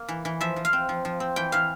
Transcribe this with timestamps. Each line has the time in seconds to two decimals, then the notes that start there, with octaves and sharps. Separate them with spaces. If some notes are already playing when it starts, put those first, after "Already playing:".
Already playing: A#3
0.08 E3
0.25 E3
0.41 F3 E5
0.56 F3
0.65 F5
0.73 C4
0.89 F3
1.05 F3
1.20 C4
1.36 E3 G5
1.52 E3 F5